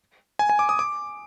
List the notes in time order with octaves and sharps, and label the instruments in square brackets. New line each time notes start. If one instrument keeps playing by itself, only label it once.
[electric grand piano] G#5
G#5
D6
D#6
D6